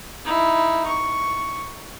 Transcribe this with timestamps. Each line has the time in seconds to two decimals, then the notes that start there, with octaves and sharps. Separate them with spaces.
0.24 D#4 E4
0.86 C#6